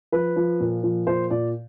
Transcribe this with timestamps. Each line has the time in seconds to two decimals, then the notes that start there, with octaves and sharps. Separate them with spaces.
0.12 F3 B4
0.36 F3
0.60 A#2
0.83 F3
1.07 A#2 C5
1.30 A#2 D5